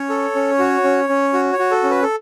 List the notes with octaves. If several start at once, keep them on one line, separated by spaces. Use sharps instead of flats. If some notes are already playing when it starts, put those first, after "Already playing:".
Already playing: C#4 C#5
A4
C#4
F#4
C#4
C#4
F#4
C#5
F#4
A4
C#4
B4
A4